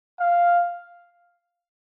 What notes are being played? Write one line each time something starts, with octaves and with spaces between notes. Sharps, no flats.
F5